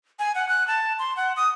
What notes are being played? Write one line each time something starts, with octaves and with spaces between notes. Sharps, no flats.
G#5
F#5
F#6
A5
C6
F#5
D#6